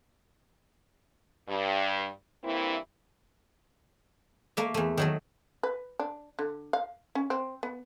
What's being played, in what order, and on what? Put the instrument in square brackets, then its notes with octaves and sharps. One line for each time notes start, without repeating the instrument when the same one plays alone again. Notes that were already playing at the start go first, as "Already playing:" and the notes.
[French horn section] G2
G2 E3 A#3 C4 E4
[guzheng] A3 A#3 E5
E2 A3
D#3 F#3 A3
[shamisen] B4
D4
D3
F5
C#4
C4
B3